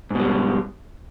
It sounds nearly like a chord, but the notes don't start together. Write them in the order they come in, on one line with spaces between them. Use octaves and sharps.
G#2 B2 G3